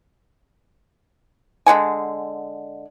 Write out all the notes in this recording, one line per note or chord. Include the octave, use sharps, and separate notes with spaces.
D3 G#3 F#5 G#5